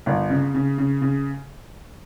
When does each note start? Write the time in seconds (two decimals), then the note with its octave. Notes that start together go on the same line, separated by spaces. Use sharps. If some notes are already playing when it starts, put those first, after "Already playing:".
0.06 G1
0.30 C#3
0.54 C#3
0.78 C#3
1.01 C#3